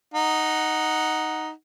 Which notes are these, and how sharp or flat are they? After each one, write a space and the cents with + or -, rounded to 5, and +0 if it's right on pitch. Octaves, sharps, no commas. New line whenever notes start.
D#4 +0 F#5 +0